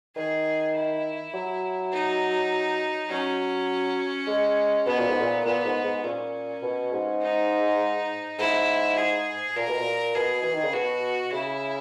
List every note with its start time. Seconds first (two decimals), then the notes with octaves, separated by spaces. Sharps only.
0.16 D#3 G#4
0.75 E4
1.34 F#3
1.92 D#4
3.10 F#3 C#4
4.27 G#3
4.86 B2 B3
4.98 A#2
5.09 G#2
5.20 A#2
5.45 A#2 B3
5.65 G#2
5.84 G#2
6.04 A#2 C#4
6.62 B2
6.92 G#2
7.22 D#4
8.38 G#2 E4
8.97 G#4
9.56 A#2 A#4
9.68 B2
9.79 A#2
10.15 B2 G#4
10.42 E3
10.53 D#3
10.64 C#3
10.74 B2 F#4
11.32 C#3 E4